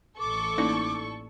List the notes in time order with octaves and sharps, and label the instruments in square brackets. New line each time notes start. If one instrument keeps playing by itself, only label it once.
[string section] A1 A4 C#6 [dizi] D6
[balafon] A#3 C#4 [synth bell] D#4 E4 D5